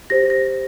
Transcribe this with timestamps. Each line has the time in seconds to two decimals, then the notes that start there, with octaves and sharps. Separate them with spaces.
0.10 G4 C5 A#6
0.30 A#6